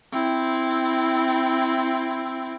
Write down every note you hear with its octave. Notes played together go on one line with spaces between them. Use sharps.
C4 E4